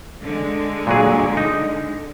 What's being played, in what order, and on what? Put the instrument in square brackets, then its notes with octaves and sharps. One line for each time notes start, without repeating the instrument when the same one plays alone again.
[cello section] D3 G#3
[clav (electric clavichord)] A#2 F#3 G#4
D#4